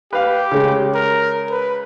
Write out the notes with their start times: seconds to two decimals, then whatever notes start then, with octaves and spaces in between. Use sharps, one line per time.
0.13 G4 B4 F5
0.51 C#3 G#3
0.95 A#4
1.51 B4